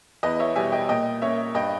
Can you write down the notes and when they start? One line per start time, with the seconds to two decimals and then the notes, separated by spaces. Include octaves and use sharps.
0.23 E2 B4 D#5
0.39 C#5 E5
0.55 B2 G3 E5 G#5
0.72 D#5 G5
0.89 A#2 D#5 G5
1.22 A#3 C#4 C#5 E5
1.55 G2 D#5 G5